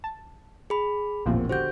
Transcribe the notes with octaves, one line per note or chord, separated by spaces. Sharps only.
A5
G#4 B5
E1 A1 D#2 A#2 F3 C4
D3 F#4 G4 C5 G6